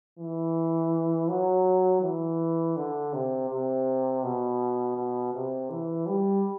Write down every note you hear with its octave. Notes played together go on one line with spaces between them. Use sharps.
E3
F#3
E3
D3
C3
C3
B2
B2
C3
E3
G3